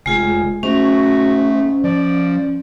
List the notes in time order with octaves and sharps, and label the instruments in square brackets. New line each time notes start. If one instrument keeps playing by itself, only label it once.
[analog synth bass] F1 [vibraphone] G#3 F4 G#4
[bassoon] G#2 [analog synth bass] A3 [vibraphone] C#4 [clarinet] F#4
[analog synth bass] F3 [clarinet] D5